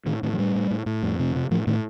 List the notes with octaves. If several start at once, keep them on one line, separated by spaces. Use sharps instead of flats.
A2 D#3
A2 D#3
F3
A2 G3
A2
A2
A2
F2
C3
C3
A2 F3
A2 D#3